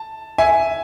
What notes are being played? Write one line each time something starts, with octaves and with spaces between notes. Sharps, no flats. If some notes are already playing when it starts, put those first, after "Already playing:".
Already playing: A5
E5 G#5